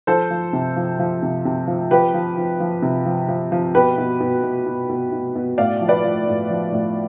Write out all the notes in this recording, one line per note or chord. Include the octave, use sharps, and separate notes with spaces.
F3 A4 C5
F3
C3
F3
F3
C3
C3
F3
F3 G4 B4
F3
F3
F3
C3
F3
F3
F3
B2 G4 B4
B2
B2
B2
B2
B2
B2
B2
A2 D5 F5
F3
B4 D5
F3
A2
F3
A2